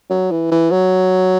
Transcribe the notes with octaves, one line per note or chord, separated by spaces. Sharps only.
F#3
E3
E3
F#3